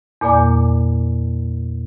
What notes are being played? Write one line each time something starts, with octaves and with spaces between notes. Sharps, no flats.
E2 A#2 A#3 D5 G#5 D6